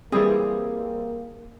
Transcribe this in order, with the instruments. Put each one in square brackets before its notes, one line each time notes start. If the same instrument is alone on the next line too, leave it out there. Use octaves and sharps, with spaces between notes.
[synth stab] E3 G3 C4 [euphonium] A#3 [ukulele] G#4